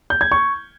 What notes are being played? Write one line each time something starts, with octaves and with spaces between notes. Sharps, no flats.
G6
G#6
C#6